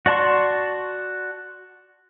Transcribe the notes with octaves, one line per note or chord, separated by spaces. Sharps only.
F#4 D5 A5 C6 C#6